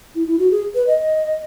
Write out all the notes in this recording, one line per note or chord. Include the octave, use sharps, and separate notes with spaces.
E4
E4
F#4
G#4
B4
D#5